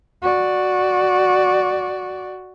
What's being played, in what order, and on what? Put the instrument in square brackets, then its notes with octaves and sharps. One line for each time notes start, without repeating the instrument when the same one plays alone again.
[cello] F#4 D5